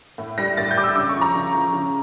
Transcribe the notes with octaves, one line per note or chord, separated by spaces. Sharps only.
A2
G3 A#6
A2 A6
G6
G3 D6
E6
C#3 D6
C#6
F3
A#5
C#3
F3
C#3